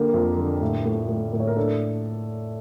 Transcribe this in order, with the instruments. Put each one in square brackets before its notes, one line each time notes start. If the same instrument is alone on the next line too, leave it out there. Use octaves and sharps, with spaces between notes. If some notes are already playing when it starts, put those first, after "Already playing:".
Already playing: [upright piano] D3 A#3 G4
F2
D3
A2
A2
A2
A2
C#5
A#4
D4 A4